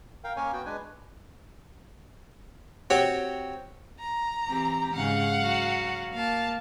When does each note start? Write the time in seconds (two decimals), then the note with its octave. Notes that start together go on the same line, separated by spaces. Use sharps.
0.24 A#4 F5 G5
0.36 A#3 C#4 A#4 C#5 G#5
0.53 B3 F#4 G5
0.66 G#3 D4 B4 G#5
2.90 C4 F#4 G4 C#5
3.99 A#5
4.48 E3 C4 G4
4.94 G#2 C#3 F5 F#5
5.39 F#3 F#4
6.13 A#3 F5 A5